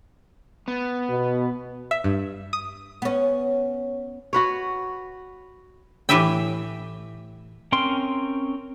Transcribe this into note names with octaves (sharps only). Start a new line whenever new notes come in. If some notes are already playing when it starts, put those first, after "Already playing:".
B3
B2
E5
G2
D#6
B3 C#4
F#4 B4 C#5
A2 E3 G4 B4 E5 G5
C4 C#4 A#4 G5 C6